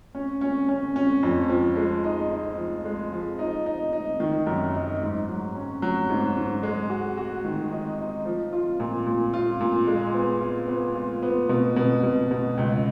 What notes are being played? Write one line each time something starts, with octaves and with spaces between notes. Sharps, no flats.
C#4
C#4
C#4
C#4
F2
F3
G#3
D#4
D#4
F3
G#3
F3
D#4
D#4
D#4
D#3
F#2
D#4
G#2
F#3
C#4
F#3
G#2
G#2
G#3
F#4
F#4
D#3
D#4
D#4
F3
F4
A#2
A#2
F4
A#2
G#3
B3
F4
B3
F4
B3
B2
B2
B2
B2
C#2